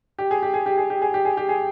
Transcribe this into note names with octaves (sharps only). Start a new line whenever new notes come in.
G4
G#4
G4
G#4
G4
G#4
G4
G#4
G4
G#4
G4
G#4